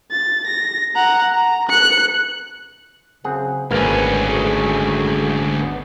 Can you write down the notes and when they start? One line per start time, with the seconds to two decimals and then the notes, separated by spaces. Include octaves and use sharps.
0.11 A6
0.47 A#6
0.95 F#5 A#5
1.34 A#5
1.69 F#6 C#7
3.24 F#2 C#3 C4 G#4 F#5
3.71 G#1 D2 A#3 C#4 B4 F5
4.29 A3 F#4 G#4
5.60 B3